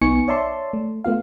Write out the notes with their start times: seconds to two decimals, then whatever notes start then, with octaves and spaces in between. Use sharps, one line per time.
0.01 B1 B3 D#4 G#5 C#6 C#7
0.28 C#5 D5 E5 A5 C6
0.73 A3
1.04 A3 B3 F4 F5